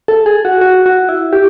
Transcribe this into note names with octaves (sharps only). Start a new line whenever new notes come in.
A4
G#4
F#4
F#4
F#4
E4
G4